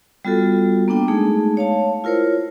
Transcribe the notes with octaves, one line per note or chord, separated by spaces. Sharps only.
G3 B3 F4 F#4 A4
A#3 B3 D4 G5
G#3 A3 D#4 G#4
C#5 F5 A5
E4 F4 A#4 C5 C#5